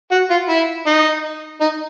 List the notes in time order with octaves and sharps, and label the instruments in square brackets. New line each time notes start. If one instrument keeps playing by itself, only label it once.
[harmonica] F#4
F4
E4
D#4
D#4